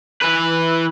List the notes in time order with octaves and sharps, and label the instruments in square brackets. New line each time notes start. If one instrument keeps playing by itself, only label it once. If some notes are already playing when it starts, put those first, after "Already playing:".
[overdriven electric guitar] E3 B4